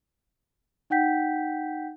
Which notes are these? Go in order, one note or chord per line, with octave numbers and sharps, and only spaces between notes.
D#4 F#5 G5 G6 B6